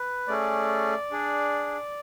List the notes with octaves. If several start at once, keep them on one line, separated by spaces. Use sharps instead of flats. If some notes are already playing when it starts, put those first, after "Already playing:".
Already playing: B4
A3 C#4 G#4 D5
D4 G#4